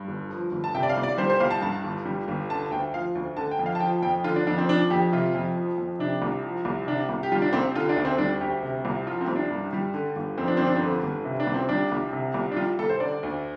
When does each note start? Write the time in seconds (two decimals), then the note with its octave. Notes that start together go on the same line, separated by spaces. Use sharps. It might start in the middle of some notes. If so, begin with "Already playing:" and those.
Already playing: G2
0.08 G1
0.30 F3
0.52 G1
0.64 A5
0.74 C3 G5
0.83 D5
0.89 F5
0.97 C2
1.03 D5
1.18 G3 C5
1.30 C5
1.40 C2 F5
1.51 A5
1.62 G2 A5
1.84 G1
2.05 G3
2.28 G1
2.50 D3 A5
2.71 D2 G5
2.93 F3 F5
3.15 D2
3.37 D3 A5
3.51 G5
3.59 F2
3.66 F5
3.75 A5
3.80 F3 G5
4.02 F2 G5
4.24 D3 F4
4.36 D4
4.47 F2 D4
4.58 C4
4.68 F3 D4
4.90 F2 G4
5.12 C3 F4
5.34 F2
5.57 F3
5.78 F2
5.99 C3 D4
6.22 C2
6.44 F3
6.65 C2
6.87 C3 D4
7.09 C2
7.23 G4
7.32 G3 F4
7.42 D4
7.53 C2 C4
7.75 D3 F4
7.89 D4
7.96 D2
8.05 C4
8.18 G3 D4
8.41 D2 G4
8.63 C3
8.85 C2
9.07 F3 F4
9.21 C4
9.28 C2
9.36 D4
9.51 G2
9.73 G3
9.94 D3
10.16 G1
10.38 F2 C4
10.48 D4
10.57 G1 C4
10.67 D4
10.77 D3 C4
11.03 G1
11.25 C3
11.40 D4
11.47 C2
11.54 C4
11.69 G3 D4
11.92 C2
12.13 C3
12.34 C2
12.51 D4
12.56 G3 F4
12.79 C2 A4
12.89 C5
13.00 D3 D5
13.23 D2